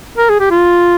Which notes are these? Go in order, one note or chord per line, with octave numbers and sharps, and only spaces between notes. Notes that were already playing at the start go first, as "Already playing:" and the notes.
A#4
G#4
G4
F4